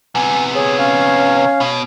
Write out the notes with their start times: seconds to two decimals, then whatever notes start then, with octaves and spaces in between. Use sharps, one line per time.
0.15 C3 B3 G#5
0.55 G#4 C#5
0.78 C#4 F5
1.61 B2